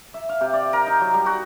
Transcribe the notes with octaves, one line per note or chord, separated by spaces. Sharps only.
E5
F5
C3
D5
A#4
D#4
F#3
G3
F#4